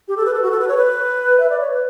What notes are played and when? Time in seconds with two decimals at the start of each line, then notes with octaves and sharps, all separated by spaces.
0.08 G4
0.17 A4
0.26 B4
0.34 A4
0.43 F#4
0.51 A4
0.60 B4
0.68 C#5
0.77 B4
1.40 E5
1.50 D5
1.60 C#5
1.70 B4